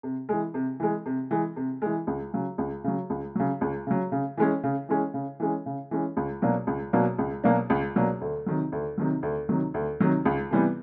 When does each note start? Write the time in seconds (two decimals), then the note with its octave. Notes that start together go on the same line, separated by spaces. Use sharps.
0.03 C3
0.29 E3 G#3
0.54 C3
0.80 E3 G#3
1.06 C3
1.31 E3 G#3
1.56 C3
1.82 E3 G#3
2.07 C#2
2.33 C#3 F#3
2.58 C#2
2.84 C#3 F#3
3.10 C#2
3.35 C#3 F#3
3.61 C#2
3.87 C#3 F#3
4.12 C#3
4.37 E3 G#3 C#4
4.63 C#3
4.89 E3 G#3 C#4
5.14 C#3
5.40 E3 G#3 C#4
5.66 C#3
5.91 E3 G#3 C#4
6.17 C#2
6.42 B2 F#3 A#3 D4
6.67 C#2
6.93 B2 F#3 A#3 D4
7.18 C#2
7.44 B2 F#3 A#3 D4
7.70 C#2
7.96 B2 F#3 A#3 D4
8.21 D2
8.46 C3 D#3 F#3
8.72 D2
8.98 C3 D#3 F#3
9.23 D2
9.49 C3 D#3 F#3
9.74 D2
10.00 C3 D#3 F#3
10.25 C#2
10.51 C3 E3 G3 B3